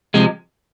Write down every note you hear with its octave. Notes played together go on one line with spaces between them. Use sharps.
C3 F3 G#3